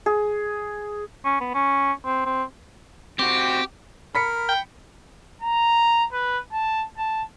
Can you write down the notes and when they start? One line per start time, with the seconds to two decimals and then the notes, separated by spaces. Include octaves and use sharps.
0.06 G#4
1.25 C#4
1.40 B3
1.54 C#4
2.05 C4
2.26 C4
3.19 C4 F#4 G4
4.15 A#4 B5 B6 C#7
4.49 G5
5.42 A#5
6.12 B4
6.52 A5
6.97 A5